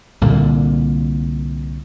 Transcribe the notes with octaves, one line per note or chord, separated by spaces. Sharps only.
C2 A#2 D3 A#3